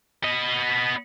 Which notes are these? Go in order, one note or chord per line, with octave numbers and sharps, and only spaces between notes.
B3 D#5